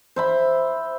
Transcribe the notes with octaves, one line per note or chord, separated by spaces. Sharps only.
C5 E5 B5